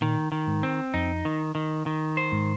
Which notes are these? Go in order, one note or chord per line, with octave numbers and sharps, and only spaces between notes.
A#2 D#3
D#3
G#2
C4
F2 D#4
D#3
D#3
D#3
C5
G#2